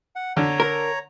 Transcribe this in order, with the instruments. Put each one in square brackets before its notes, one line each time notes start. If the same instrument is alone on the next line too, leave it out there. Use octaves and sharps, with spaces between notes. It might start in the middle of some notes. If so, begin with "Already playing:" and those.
[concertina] F#5
[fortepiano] D3 [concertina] C#5 A#5
[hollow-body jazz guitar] A#4